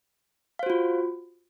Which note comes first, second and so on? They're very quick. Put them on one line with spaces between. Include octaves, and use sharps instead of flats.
F5 C5 F#4 F4